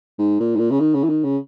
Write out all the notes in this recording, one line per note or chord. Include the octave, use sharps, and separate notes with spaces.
G#2
A#2
G#2
A#2
C#3
D#3
C#3
E3
D#3
C#3